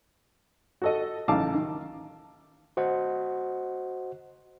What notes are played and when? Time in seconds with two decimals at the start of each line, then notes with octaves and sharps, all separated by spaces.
0.82 F#4 A4 D#5
1.28 A1 C#3 D#4 F5 A5 D6
1.55 D#3
2.77 F#4 C5 D#5 F#5